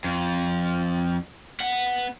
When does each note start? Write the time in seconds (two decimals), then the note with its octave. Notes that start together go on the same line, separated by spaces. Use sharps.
0.04 F2
1.60 B3 F#5